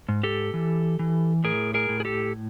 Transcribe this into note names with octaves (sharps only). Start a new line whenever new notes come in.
G#2
G4 A4
E3
E3
A2 G#4 A#4
G#4 A#4
A2
G#4
G4 A4